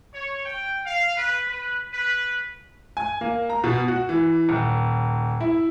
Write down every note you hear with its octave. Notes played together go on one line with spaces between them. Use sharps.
C#5
G5
F5
B4
B4
B4
G#5
A#3
A#5
B2
F#4
E3
D#1
E4